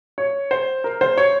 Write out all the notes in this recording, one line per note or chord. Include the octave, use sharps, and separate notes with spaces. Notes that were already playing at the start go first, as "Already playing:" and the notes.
C#5
C5
A#4
C5
C#5